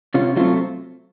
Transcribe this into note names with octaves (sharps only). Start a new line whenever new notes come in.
C3 C#4 F4
F#3 A3 C4 C#4 F4